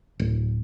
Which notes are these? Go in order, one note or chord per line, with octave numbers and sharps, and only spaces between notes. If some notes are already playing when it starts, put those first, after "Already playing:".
D1